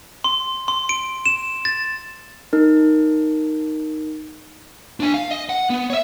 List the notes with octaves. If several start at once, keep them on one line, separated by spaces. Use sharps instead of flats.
C6
C6
D7
E7
A6
D#4 A#4
D4 G#5
F5
D#5
F#5
B3
C#5 E5